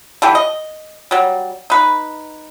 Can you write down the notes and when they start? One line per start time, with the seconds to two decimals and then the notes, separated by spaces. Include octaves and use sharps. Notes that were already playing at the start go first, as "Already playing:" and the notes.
0.22 D3 E3 G4
0.35 D#5
1.11 F#3 G3
1.70 D#4 B4